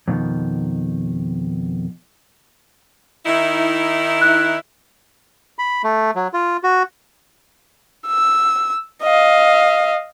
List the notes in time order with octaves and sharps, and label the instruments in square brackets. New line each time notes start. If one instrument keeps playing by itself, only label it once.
[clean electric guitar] F2 B2 D#3
[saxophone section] D#3 D#4 E4
[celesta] F#6
[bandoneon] B5
A3
F#3
F4
F#4
[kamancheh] E6
D#5 F5